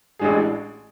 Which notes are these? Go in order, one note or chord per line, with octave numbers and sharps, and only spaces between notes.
A1 A2 G#3 D4 G#4